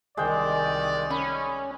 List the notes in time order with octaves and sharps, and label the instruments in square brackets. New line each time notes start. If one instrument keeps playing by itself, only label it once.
[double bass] C2 D#3 [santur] G#3 C5 G5 [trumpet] D5
[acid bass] C#4 [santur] B5